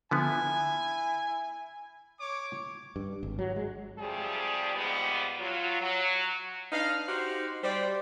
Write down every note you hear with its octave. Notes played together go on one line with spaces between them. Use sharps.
D3 F3 B3 E4 G#5
C#5 D6
G2
G#1
F#3
G#3
C3 F3 G3 A3 G4 G#4
G#2 F3 G3 A#3 B3
F#3 F4
F#3
D4 D#4 B4 F5
D#4 F#4 G4 C5
G3 C5 D5